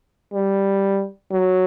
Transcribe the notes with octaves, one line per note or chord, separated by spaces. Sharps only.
G3
F#3